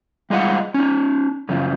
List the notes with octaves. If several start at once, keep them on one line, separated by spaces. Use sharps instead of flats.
G3 G#3 F4 D#5 F#5
C#4 D#4
F#2 C#3 F3